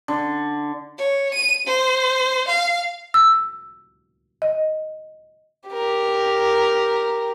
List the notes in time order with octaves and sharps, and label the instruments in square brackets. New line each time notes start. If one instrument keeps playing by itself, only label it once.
[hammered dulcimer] D3
[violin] C#5
D#7
C5
F5
[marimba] E6
D#5
[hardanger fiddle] G4 A#4